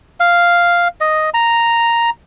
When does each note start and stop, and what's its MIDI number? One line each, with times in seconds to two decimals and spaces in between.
0.20 0.88 77
1.01 1.30 75
1.34 2.10 82